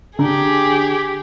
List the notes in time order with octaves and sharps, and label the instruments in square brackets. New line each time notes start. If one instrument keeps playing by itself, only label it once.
[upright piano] D3 A#5 [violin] G4 G#4